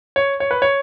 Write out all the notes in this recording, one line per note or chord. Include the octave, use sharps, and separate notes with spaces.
C#5
C#5
B4
C#5